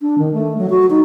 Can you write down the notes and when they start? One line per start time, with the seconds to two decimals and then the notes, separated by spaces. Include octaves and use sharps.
0.02 D4
0.18 D#3
0.34 A3
0.58 F#3
0.70 F#4
0.90 D#4